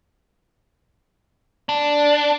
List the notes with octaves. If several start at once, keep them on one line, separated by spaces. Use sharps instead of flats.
D4